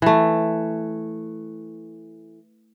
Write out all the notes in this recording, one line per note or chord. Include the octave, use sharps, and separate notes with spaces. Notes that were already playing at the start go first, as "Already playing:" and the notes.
E3 A3